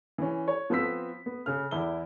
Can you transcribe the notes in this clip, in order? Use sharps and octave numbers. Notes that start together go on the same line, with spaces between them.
E3 C#4
C#5
F3 B3 C4 E6 B6
B3
C#3 F6
E2 E4 G7